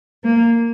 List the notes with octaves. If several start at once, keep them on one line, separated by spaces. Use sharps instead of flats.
A#3